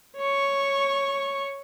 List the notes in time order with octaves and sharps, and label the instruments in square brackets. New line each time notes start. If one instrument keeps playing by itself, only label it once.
[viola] C#5 C#6